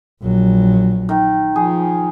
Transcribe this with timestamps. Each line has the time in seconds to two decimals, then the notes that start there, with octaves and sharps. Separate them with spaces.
0.22 A#1 F#3
1.09 D#3
1.56 F3 G#4